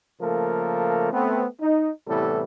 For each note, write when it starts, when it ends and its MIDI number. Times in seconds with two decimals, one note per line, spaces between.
0.21 1.12 49
0.21 1.12 53
0.21 1.12 57
0.21 1.12 58
0.21 1.12 69
0.21 1.12 70
1.13 1.45 57
1.13 1.45 59
1.13 1.45 60
1.61 1.90 63
2.07 2.43 45
2.07 2.43 48
2.07 2.43 52
2.07 2.43 55
2.07 2.43 59
2.07 2.43 69